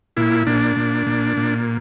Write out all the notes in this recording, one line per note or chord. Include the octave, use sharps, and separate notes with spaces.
A#2 E4
A#2 D4
A#2
A#2
A#2